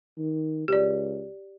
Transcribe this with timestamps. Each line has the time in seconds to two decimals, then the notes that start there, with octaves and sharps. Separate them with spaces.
0.18 D#3
0.68 C#2 G4 D5